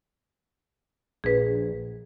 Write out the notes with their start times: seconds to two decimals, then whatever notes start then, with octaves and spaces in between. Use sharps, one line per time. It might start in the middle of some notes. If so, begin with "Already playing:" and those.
1.24 A#1 G#4 B4